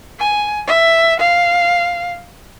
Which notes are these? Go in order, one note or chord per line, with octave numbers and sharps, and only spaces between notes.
G#5
E5
F5